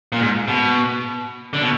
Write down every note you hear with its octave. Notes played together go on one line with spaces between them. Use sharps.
A#2
G#2
B2
D3
B2